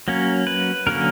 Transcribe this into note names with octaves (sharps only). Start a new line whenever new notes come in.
F#3 A#3 C#4
B4
D3 F#3 A#3 C#4 A#4